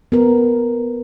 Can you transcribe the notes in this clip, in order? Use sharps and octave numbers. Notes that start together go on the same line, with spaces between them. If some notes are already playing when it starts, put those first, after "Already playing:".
B3 A#4